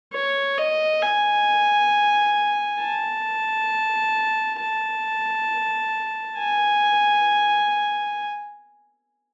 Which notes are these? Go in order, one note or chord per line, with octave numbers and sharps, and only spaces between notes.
C#5
D#5
G#5
A5
A5
G#5